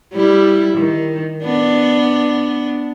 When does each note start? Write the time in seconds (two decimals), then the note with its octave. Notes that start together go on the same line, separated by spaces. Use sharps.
0.13 G3 E4
0.78 D#3
1.44 B3 D4